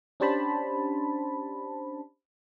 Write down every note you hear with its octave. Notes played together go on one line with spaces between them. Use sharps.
C#4 D4 G4 C5 A5 B5